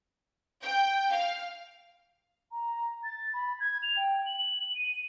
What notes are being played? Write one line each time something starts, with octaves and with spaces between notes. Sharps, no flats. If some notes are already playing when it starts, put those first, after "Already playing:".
G5
F5
A#5
A6
B5
G#6
F7
G5
F#7
D#7